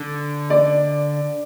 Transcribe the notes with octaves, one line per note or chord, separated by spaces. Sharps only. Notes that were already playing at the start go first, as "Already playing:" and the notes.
Already playing: D3
D5